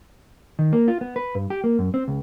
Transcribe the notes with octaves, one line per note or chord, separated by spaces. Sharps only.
D#3
A#3
F4
B3
B4
G2
G4
A#3
F#2
C4
C#2